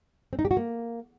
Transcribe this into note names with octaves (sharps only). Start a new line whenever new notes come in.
C4
D#4
G4
F#4
A#3